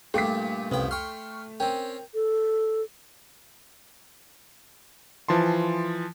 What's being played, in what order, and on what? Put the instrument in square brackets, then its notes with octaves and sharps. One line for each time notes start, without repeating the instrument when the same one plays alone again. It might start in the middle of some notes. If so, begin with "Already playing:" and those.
[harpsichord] G2 A#2 [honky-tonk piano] A3 B6 [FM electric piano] G5 D6
[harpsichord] C2 F2 G5 [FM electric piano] C3 C#4 B4
[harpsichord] G5 C6 [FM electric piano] C#6 F6
[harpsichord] C4 C#4 [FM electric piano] A#4 G5
[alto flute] A4
[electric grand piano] E3 F3 A5 C6